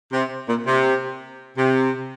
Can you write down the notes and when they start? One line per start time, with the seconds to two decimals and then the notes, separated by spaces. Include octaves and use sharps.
0.12 C3
0.48 A#2
0.66 C3
1.57 C3